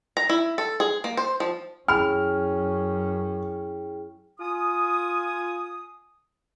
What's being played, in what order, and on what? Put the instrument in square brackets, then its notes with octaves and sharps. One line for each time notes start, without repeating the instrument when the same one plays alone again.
[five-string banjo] A#5
E4
A4
G#4
A#3
C5
F3
[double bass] F#2 C#4 [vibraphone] E4 G#4 G5 [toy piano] G#5 B5 [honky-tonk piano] F6
[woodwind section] F4 G#5 D#6